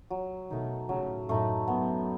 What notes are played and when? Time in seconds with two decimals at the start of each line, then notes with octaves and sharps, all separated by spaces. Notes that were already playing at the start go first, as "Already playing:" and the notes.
0.10 F#3
0.50 B2 D#3 A3 D#4
0.89 A2 C#3 F#3
1.28 F#2 A2 A3 D#4
1.68 F#2 B3